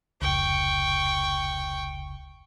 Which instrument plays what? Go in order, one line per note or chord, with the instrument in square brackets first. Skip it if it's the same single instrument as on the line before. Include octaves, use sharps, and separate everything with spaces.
[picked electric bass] F1 C#2 [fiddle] G5 C#6